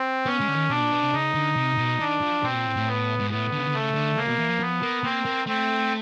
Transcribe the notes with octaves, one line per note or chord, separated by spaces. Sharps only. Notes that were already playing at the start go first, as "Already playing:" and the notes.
Already playing: C4
B3 C#4
G#3
D3
D#3
B2 D4
A#2
B2
C3
C#3 D#4
D3
C3
B2
D#3 D4
F3
B2 C4
A#2
A2
A2
B3
G#2
A2 B3
D3
C#3
D3
C#3 A3
D3
C#3 A#3
B2
E3
F3
F3 B3
A#3
A#3 C4
A#3
A3 C4